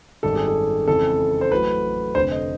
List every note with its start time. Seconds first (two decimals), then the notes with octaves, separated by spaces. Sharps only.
0.23 G#1 F#2 D#3 G3 A4
0.36 G#4
0.48 A4
0.87 F2 C#3 E3 G#3 A4
1.41 C5
1.52 A1 A2 F#3 B4
2.15 F1 F2 D3 C5
2.32 D#5